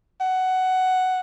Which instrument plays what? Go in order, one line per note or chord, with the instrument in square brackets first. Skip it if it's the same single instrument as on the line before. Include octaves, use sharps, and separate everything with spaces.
[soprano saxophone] F#5